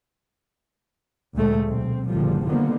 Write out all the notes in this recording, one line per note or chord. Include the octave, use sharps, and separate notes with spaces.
D2 A#2 G#3 A3
B1 C4
F#1 A#2 D3 F3 G3
D3 D#3 F3 G3 A#3 B3